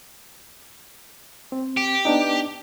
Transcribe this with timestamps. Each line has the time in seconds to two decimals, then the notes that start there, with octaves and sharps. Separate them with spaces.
1.52 C4
1.77 G4
2.05 B3 D4 D#4